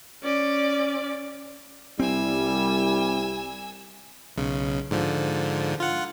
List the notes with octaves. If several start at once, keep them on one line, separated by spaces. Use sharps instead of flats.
C#4 D5
C2 G3 C4 E4 G#5 E6
B1 C#3
G#2 D3 F3
F4 F#5